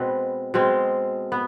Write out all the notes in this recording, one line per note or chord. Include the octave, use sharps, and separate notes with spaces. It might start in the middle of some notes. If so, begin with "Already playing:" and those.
Already playing: B2 G#3 C4 B4
B2 G#3 C4
B3